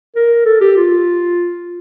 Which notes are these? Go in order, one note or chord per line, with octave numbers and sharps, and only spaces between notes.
A#4
A4
G4
F4